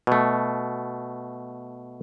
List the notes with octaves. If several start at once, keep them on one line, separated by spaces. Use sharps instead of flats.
B2 A3